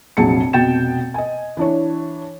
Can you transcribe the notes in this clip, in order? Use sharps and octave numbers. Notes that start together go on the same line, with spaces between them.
F1 A#1 F#3 G#4 A5 C#7
F1 B2 F#4 G5 A6 E7
D#5 G#5
E3 D4 C#5